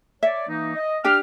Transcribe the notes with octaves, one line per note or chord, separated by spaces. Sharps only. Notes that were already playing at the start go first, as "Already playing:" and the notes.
C#5 D5 E5
E3 A#3 D#4
D#5
D4 G4 G5 F6